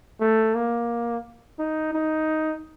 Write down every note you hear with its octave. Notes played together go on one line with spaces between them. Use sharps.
A3
A#3
D#4
D#4